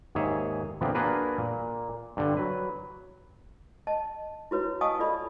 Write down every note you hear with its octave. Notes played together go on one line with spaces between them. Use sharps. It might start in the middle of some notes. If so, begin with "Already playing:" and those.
D#2 G#2 G#4 C#5 E5
A#2 D3 E3 F3 B3 C4
A#3 D4 F#4 G#4 A#4 B4
A#2
G2 D3 G3
F#3 B4
D#5 A5
E4 F#4 B4 C#5
D#5 F5 G#5 A5 C#6 D#6
F4 A4 D5 D#5 B5